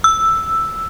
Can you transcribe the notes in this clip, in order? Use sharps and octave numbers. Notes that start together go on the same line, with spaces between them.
E6